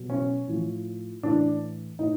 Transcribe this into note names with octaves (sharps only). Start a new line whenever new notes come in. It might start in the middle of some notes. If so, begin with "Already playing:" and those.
Already playing: B2 F#3
C#4
A2 F3
A2 E3 D4
A2 D#4